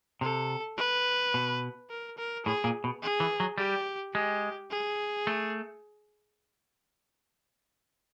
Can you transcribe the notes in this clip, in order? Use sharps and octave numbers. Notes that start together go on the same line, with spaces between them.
C3 A4
B4
B2
A#4
A#4
A2 G#4
A#2
B2
G#4
E3
F#3
G3 G4
G#3 G4
G#4
A3